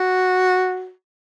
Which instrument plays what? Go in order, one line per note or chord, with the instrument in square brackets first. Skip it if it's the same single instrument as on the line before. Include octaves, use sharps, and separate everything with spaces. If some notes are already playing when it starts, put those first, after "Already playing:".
Already playing: [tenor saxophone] F#4